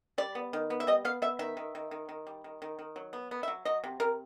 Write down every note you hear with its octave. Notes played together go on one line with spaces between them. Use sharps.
G3 D5
B3
D#3
B3
E5
G3 D#5
B3 F5
B3 E5
D#3 E5
D#3
D#3
D#3
D#3
G3
D#3
D#3
D#3
F#3
B3
B3
E5
F#3
F#3 D#5
C3
C3 A#4